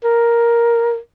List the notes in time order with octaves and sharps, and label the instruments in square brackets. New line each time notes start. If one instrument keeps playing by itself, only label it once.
[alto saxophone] A#4